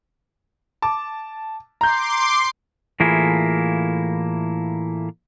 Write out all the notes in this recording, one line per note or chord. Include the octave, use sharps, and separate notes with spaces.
A5 D6
A#5 C6 D6 G6 C7
A2 E3 A#3 E4 F4 G#4